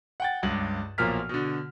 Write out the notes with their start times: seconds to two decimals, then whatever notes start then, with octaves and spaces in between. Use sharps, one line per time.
0.20 F#5 G5 A6
0.43 C#2 G2 F#7
0.98 B1 A#2 F3 A#4 F6 B6
1.29 B2 D3